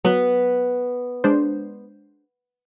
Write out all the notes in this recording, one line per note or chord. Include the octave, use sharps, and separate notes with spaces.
F#3 B3 B4
G#3 D4 C5